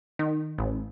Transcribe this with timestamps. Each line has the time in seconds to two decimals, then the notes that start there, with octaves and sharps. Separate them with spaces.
0.19 D#3
0.58 A1